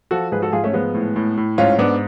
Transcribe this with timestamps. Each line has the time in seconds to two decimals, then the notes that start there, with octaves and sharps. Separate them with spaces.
0.11 F3 F#4 A4
0.32 G#2 G#4 B4
0.42 F#4 A4
0.52 G#2 F4 G#4
0.64 A3 C#4
0.73 F3 G#3 B3
0.94 A2
1.16 A2
1.37 A2
1.58 G#2 C#4 F4
1.78 G#2 B3 D4